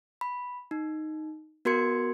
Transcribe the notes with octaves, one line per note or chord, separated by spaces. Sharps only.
B5
D#4
B3 F#4 A#4 C6 G#6 C#7